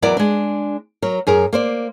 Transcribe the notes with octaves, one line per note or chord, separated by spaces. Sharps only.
E2 F#3 E4 A#4 D5 F#5
G#3 D4
F#3 A#4
F#2 G#4 A#4
A#3 C5 D5